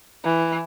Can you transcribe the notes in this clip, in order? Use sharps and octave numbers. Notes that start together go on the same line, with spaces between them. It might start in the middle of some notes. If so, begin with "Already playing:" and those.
E3